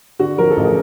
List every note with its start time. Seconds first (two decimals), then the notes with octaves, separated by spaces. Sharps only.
0.19 D3 F#4
0.38 F3 A#4
0.50 A4
0.57 A1
0.63 G#4